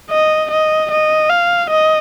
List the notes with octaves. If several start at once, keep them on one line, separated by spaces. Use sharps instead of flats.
D#5
D#5
D#5
F5
D#5